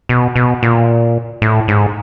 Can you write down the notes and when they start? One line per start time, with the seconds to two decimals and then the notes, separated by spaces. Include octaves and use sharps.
0.09 B2
0.36 B2
0.63 A#2
1.42 A2
1.68 G#2